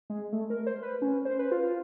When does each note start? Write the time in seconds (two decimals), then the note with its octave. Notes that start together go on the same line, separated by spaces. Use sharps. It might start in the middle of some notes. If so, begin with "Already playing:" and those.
0.10 G#3
0.33 A3
0.50 A#4
0.67 C5
0.83 B4
1.02 C#4
1.25 C5
1.39 B4
1.52 F4